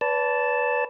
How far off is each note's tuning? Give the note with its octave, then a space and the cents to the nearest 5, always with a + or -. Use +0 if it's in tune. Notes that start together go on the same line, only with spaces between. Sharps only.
B4 +0 D5 -45 A5 +0